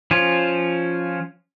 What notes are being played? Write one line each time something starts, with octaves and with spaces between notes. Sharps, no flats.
F3 C#4 F4